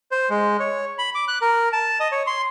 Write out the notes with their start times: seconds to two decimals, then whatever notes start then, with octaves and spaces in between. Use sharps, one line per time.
0.11 C5
0.30 G#3
0.60 C#5
0.98 B5
1.15 D6
1.28 F#6
1.42 A#4
1.73 A5
2.00 D#5
2.12 C#5
2.27 C6